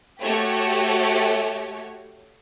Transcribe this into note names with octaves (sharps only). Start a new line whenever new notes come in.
A3 F#4 G4 C#5